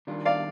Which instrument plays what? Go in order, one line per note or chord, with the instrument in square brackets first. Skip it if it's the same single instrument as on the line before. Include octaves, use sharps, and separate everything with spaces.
[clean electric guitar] D#3 G3 D4 F4
[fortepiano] D5 F5